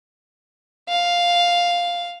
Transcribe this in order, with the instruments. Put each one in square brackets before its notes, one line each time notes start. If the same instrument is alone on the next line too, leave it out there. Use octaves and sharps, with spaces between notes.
[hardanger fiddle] F5